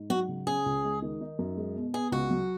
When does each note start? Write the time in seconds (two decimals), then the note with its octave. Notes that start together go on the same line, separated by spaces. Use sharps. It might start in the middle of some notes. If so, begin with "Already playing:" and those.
Already playing: G#2
0.10 F#3 F#4
0.29 C#3
0.47 C#4 G#4
0.66 C#2
0.84 G#3
1.02 D#3
1.21 D#4
1.39 F#2
1.57 G#3
1.76 B2
1.93 B3 G#4
2.12 C#2 F#4
2.31 F#3